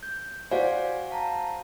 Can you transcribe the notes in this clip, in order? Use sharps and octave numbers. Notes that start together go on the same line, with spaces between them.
G6
F#4 C5 D5 F5 G#5
F5 A5 A#5